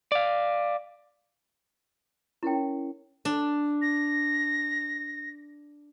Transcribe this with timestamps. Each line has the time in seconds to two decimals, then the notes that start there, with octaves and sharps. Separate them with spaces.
0.12 D5 F5
2.43 C#4 E4 A#4 C#5 G5
3.25 D4
3.82 A#6